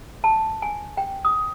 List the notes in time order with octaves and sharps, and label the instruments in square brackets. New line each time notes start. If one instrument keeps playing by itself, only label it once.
[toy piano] A5
G#5
G5
D#6